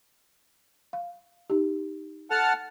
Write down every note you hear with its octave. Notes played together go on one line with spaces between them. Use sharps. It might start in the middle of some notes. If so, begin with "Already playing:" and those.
F5
D#4 G4
A4 F#5 A5 F6